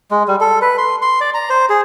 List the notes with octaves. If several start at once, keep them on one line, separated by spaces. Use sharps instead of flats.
G#3
G3
A4
B4
C6
C6
D5
A#5
C5
G#4